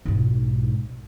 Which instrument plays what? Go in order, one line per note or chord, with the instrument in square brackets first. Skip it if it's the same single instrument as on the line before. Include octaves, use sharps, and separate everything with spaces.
[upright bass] B1 G#2